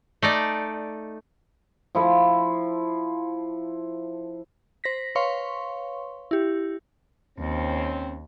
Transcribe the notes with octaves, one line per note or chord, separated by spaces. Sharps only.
A3 D#4 D5
F3 E4 A4
C5 A#6 B6
B4 C#5 F5 C6 C#6
E4 G4
D#2 C4 C#4